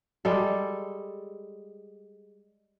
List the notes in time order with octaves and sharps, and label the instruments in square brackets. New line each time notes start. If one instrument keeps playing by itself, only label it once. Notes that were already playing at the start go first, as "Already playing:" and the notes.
[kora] G3 G#3 A4